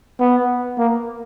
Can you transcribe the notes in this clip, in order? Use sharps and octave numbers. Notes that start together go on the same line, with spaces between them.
B3
A#3